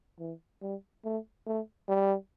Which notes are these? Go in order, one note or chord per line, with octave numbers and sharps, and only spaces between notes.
E3
G3
A3
A3
G3